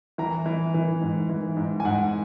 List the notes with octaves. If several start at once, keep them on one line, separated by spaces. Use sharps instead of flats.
E3 A#5
E3
E3
G#2
E3
G#2
G#5
G#2 F#5